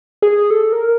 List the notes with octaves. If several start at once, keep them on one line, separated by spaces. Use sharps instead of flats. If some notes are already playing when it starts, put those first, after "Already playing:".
G#4
A4
A#4